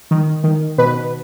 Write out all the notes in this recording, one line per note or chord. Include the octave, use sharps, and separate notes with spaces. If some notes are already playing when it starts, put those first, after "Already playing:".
D#3
D#3
B2 B4